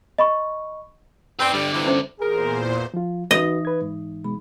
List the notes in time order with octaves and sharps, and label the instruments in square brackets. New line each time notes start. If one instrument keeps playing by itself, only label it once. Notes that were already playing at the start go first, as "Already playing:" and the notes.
[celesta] D#5 B5 C#6
[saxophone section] C4 [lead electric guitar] B4 D5
[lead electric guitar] G2 D3 [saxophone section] G3
[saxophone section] C3 E3 [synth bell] D6
[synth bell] C#4 C5 D6
[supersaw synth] E2 A#2 C5 [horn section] G#4 A#4
[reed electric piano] F3 F4
[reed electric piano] C#2 F#4 B4 [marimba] E3 D#4 [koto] D#5
[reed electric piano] B4 G#6
G#2
[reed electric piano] B2 G#3 [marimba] B5